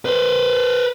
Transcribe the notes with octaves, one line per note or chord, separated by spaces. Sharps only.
B4 C5